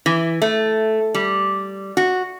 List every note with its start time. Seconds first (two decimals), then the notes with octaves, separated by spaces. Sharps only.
0.06 E3
0.42 A3
1.14 G3
1.97 F#4